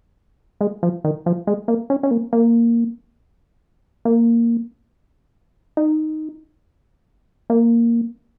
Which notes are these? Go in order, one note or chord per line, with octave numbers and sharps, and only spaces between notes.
G#3
F3
D#3
F3
G#3
A#3
C#4
C#4
A#3
A#3
A#3
D#4
A#3